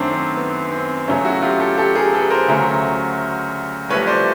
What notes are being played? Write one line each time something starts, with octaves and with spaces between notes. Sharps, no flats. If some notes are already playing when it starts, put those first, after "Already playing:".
Already playing: F#2 D#3 F#3 A3 C4 D4
C4
B3
C4
F#2 C#3 F#3 A3 B3 C#4
E4 F#4
F4 G4
G4 A4
G4 A4
G#4 A#4
A4 B4
A#4 C5
D2 C#3 F#3 A3
C2 C3 F3 A3 B4 C#5
C5 D5